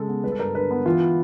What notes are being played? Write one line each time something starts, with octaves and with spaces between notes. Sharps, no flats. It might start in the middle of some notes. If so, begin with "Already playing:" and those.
Already playing: C#3 G#3 A4
B3
G3 B4
A4
G2 A#4
D3 B4
B3
E3 F4